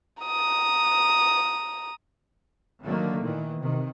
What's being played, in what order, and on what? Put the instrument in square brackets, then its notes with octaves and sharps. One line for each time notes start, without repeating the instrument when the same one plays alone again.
[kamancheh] A#5 D#6
[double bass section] D3 D#3 F#3 A3 A#3
A#2 D#3 E3
C3 D#3